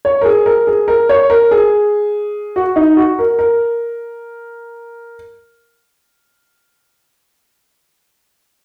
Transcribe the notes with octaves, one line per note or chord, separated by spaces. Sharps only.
C#5
A#4
G#4
A#4
G#4
A#4
C#5
A#4
G#4
F#4
D#4
F#4
A#4
A#4